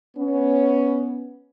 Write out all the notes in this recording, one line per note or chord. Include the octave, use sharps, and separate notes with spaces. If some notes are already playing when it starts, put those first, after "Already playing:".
B3 C#4